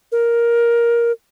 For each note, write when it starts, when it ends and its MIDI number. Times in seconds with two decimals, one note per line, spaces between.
0.12 1.12 70